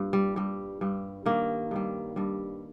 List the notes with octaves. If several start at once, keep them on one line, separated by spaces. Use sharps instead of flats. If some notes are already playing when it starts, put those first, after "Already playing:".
Already playing: G2 A#2
G3
G2 G3
G2 G3
G2 D#3 G3 A#3
G2 D#3 G3
G2 G3